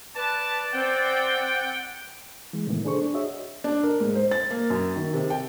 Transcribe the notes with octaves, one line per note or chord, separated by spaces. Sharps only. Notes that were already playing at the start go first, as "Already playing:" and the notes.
B4 D5 A5
C4 F#5 G5
E3 G#3
A2 C3 D#3 E3 B3
D4 G#4 A4 C5 C#6
D4
F#4 G#4 C#5 D#5 E5
D4
A#4
G#2
C5
A6
A#3
F#2
D#3
C3
G5